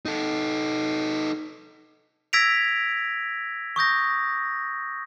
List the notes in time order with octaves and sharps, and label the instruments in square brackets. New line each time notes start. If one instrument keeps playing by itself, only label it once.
[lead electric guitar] D#4 A4
[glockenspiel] E6 G#6 A#6 B6 D7 F7
C#6 D#6 G6 A#6